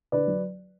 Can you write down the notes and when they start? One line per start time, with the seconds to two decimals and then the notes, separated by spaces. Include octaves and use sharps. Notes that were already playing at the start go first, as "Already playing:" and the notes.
0.12 D3 B4 D5
0.27 F#3